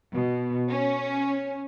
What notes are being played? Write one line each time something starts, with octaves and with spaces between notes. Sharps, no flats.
B2
C#4